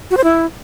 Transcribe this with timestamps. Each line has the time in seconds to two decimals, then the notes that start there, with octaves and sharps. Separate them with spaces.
0.11 F#4
0.17 C5
0.24 E4